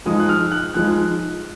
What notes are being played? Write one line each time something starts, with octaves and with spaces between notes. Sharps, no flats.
F3 G#3 D#4 D#6
F#6
F6
F#6
F3 G#3 D#4 F#6